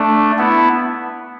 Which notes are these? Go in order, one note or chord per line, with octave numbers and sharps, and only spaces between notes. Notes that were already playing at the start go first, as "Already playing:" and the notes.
Already playing: A3 D4
B3 E4